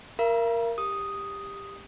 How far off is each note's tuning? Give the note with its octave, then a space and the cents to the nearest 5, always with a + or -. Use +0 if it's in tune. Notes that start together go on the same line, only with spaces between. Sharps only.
A#4 +0 F5 -45 A#5 +45
G4 +15 D#6 +0